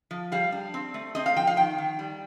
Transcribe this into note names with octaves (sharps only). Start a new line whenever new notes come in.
F3
G3 F5
D4
C4
A3
C4 D#5
F5
F3 G5
F5
D#3 G5
D#3
G3